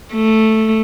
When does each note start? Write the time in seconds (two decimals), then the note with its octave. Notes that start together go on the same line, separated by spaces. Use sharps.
0.13 A3